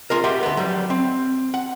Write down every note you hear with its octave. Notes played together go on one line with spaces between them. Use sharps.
F4 G#4 A#4
G4 E5 F#5 C6
D2 B3
F#3 G3
C4
F#5